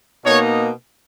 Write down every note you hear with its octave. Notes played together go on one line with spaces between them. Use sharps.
B2 A#3 D#4 C#5